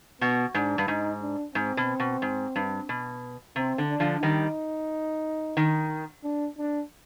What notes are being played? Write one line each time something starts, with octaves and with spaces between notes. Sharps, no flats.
B2 B3
G#2 D4
G2
G#2 D#4
D4
G#2 C4
B2
B2
G#2
G2
B2
C3 C4
D3
D4
D3 F3
D#3 G3 D#4
D#3
D4
D4